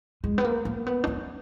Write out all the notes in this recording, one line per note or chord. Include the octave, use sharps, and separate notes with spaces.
G#3
B3
A#3
A#3
B3
D4
C#4